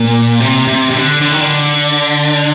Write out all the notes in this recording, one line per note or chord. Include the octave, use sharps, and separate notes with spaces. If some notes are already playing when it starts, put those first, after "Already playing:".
Already playing: A#2
C3
C3
C3
D3
D3
D#3
D3